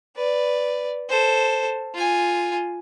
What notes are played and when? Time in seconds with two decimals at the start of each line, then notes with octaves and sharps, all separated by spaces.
0.16 B4 D5
1.09 A4 C5
1.94 F4 G#5